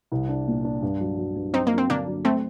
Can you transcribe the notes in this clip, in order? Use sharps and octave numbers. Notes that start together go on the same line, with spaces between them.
C2
D4
A#2
D4
G2
F#3
F#3
G2
F#3 C4 D#4
F#3 A#3
C4
D3 A#3 D4
F#3
F#3 A3 C4